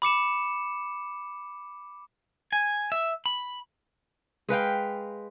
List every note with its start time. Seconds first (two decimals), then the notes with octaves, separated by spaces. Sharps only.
0.02 B5 D6 C#7 E7
2.52 G#5
2.92 E5
3.26 B5
4.49 G#3 B4 F5 G5